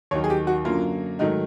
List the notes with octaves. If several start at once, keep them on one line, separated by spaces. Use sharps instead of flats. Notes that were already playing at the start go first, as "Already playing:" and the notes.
D#2 D#3 F#3 C#5
G#4
G4
F#4
F#2 D3 F#3 A#3 F4
G#2 D#3 F#3 A3 D#4